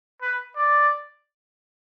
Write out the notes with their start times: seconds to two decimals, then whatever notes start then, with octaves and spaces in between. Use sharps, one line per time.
0.22 B4
0.56 D5